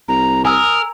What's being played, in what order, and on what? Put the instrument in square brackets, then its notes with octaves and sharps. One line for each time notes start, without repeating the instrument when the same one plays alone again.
[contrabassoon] C2 [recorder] A#5
[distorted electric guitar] A#4 [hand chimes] G#5 A#5 E6 [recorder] D#6